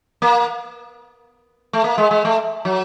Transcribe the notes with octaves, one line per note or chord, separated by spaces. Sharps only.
A#3
A3
A#3
G#3
G#3
A3
F#3